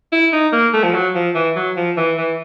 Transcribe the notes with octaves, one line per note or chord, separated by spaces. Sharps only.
E4
D#4
A#3
A3
F3
F#3
F3
E3
F#3
F3
E3
E3